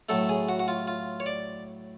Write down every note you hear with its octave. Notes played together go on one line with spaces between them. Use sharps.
A2 F#3 A3 A4
G#4
F#4
F#4
F4
F4
C#5
D5